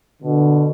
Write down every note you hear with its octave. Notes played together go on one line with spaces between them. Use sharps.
B2 D3